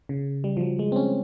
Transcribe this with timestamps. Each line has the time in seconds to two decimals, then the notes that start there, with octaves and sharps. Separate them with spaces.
0.09 C#3
0.44 G3
0.57 F3
0.61 F#3
0.79 G#3
0.92 C4
0.96 C#4